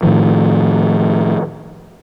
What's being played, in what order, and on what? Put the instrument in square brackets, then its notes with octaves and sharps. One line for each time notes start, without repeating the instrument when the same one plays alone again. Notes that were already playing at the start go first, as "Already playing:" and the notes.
[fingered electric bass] A2 D#3 F3